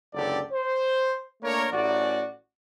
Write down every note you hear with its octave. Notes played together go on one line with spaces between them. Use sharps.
F#1 C#2 D3 G4 A4 D5
C5
A3 A#3 D4 A#4 C#5
A1 F#4 D5